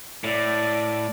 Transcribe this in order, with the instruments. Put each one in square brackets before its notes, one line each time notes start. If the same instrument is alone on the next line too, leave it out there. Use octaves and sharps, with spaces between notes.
[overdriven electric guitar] A2 [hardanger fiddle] D5